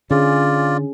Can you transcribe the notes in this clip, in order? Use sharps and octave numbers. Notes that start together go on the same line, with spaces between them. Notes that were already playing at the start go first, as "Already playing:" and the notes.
D3 C#4 F4 G#4 D5